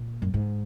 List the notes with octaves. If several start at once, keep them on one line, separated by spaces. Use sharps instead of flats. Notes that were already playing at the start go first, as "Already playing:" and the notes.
Already playing: A#2
F#2
G#2